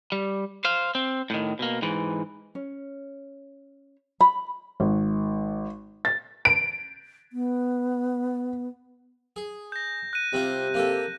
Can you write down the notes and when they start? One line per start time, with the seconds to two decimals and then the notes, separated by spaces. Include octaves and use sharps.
0.12 G3
0.65 C5 F5
0.95 C4
1.30 A2 D#3
1.59 B2 A#3
1.82 G#2 E3
2.55 C#4
4.21 B5
4.80 G#1
6.05 A6
6.45 D7
7.33 B3
9.36 G#4
9.72 G6 A#6
10.13 F#6 D#7
10.33 C3 G3 C4 F4
10.74 A#3 G4 A4